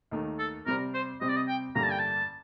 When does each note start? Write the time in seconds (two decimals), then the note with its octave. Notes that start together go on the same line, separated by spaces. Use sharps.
0.11 D#2 D#3 A3
0.39 A4
0.66 C3 G3 C4 A#4
0.94 C5
1.21 C3 G3 C4 D#5
1.28 D5
1.36 D#5
1.48 G5
1.75 A1 G2 D3 G3 A#3 A#5
1.83 A5
1.91 G5
1.99 A5